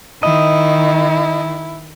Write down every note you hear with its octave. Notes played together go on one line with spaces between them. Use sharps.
D#3 E4 D#5